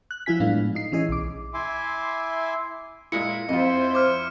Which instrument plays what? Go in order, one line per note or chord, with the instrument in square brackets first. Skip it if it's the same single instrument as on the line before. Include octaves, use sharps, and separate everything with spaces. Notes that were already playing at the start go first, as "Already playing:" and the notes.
[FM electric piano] F#6
F3 F#3 E4 F4 G#5 B6
A2 G#3 B3 D4 F5
D#4 C7
E3 C#4 E4 G#4 D#5
B1 D6
[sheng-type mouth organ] E4 E5 G#5 C6 D6
[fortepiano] A#2 G#3 E4 [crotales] C#7
[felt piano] F2 [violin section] E4 C5 [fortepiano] F4 D#5
[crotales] D6 F6